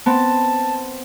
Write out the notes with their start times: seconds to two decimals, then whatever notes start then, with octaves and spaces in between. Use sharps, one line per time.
0.06 B3 C4 A5